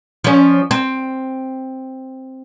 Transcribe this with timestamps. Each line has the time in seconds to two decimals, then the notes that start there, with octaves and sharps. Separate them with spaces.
0.24 F3 C#4
0.71 C4